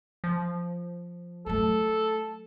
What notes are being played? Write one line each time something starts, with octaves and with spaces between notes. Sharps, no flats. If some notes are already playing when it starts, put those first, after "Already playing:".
F3
F#3 A3 A4